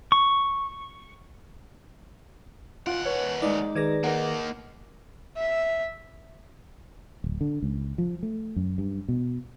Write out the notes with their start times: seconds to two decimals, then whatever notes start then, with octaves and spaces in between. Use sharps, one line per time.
0.12 C#6
2.87 D#2 F4 F#5 D7
3.05 B4 C#5
3.42 G#3 D#4 D5
3.75 D#3 G#4 B4 D5 G#6 A#6
4.04 A#3 D#4 A#4 F#5
5.37 E5
7.24 D1
7.41 D3
7.63 C#2
7.98 F3
8.23 A3
8.56 F#2
8.78 G2
9.08 B2